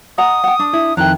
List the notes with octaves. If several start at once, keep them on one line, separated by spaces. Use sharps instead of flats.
D#5 F#5 A#5 D#6
F#5 G5
D4
E4
F2 D#3 E4 G5 A#5 F#6